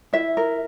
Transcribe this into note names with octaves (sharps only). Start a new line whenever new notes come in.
E4 E5
A#4